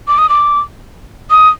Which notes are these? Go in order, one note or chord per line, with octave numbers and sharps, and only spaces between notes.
D6
D#6
D6
D#6